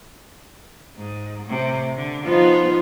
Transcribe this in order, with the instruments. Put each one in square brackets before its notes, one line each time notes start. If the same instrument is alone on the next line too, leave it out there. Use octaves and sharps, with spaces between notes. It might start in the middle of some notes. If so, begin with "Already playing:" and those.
[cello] G#2
A2 C3
D3
[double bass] F3 [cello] B3 [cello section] D#4 F4